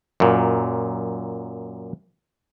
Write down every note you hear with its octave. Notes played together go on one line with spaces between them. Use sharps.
F#2 A#2